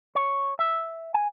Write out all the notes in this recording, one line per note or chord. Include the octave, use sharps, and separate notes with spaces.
C#5
E5
G#5